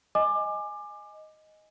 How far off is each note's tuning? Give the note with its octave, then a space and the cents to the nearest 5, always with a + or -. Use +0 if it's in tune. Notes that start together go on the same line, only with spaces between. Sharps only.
D#5 +0 G#5 +0 D6 +25